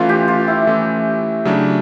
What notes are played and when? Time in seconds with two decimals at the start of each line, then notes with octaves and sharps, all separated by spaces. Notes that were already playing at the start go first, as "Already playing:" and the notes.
Already playing: E3 A3 C#4 F4
0.09 G4
0.28 F4
0.48 E4
0.67 E3 A3 C#4
1.45 C#3 F#3 A3 D4